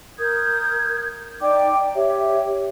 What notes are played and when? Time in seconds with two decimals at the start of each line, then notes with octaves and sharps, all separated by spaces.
0.19 A#4 D#6 G6 G#6
1.41 D#4 D5 G5 D6
1.95 G4 C#5 E5